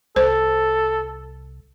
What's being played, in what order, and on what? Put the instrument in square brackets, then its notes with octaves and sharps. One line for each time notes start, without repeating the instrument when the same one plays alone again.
[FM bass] C2 [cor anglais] A4 [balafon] C5